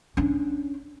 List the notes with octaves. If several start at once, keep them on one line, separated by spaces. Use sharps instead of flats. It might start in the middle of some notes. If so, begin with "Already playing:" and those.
C#4 D4